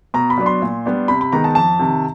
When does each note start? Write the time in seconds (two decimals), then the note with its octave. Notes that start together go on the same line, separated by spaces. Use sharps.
0.14 B2 A#5
0.30 B5
0.38 F#3 B3 D4
0.46 C6
0.62 A#2
0.85 G3 B3 D4
1.08 C3 B5
1.21 B5
1.32 D#3 G#3 B3 D#4 A#5
1.44 A5
1.55 F2 A5
1.79 C3 D#3